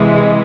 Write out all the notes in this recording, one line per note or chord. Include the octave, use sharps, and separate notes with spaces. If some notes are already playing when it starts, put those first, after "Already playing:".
Already playing: C3 E3 G#3